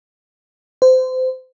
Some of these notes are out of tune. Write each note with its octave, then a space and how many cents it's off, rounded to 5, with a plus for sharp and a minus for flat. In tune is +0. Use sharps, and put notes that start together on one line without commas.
C5 -25